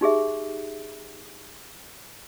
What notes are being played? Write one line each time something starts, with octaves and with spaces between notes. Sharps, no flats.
D#4 G4 G#4 E5